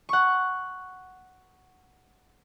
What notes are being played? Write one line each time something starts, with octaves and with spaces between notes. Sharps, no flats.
F#5 C#6